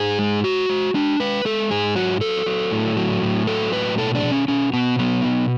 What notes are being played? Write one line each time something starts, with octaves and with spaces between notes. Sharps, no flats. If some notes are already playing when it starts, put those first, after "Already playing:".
Already playing: G#2 G#4
G#3
G#3 F#4
G#3
G#3 D4
G#3 B4
G#3 A4
G#2 G#4
F#3 F#4
F#3 A4
F#3
A2
F#3
A2
F#3 A4
A2 B4
B2 A4
D4
B2
C#4
B2 C#4
B2 B3
F#3 B3
B2